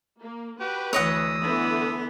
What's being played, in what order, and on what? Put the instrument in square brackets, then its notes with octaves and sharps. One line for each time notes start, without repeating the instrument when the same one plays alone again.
[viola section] A#3
[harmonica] F#4 G4 [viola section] B4
[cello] D2 E3 [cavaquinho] C#5 D#5 F#5 [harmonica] D#6 E6
[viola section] D3 E3 [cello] B3